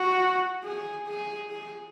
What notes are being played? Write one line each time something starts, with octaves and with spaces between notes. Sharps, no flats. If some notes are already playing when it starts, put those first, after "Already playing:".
Already playing: F#4
G#4
G#4
G#4